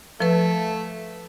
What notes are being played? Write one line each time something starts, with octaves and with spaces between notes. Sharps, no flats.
F3 A3 B4